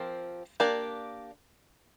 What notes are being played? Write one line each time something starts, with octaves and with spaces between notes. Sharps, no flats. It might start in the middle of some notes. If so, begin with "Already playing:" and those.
Already playing: F3 C4 G4 A#4
A#3 D4 G4 D5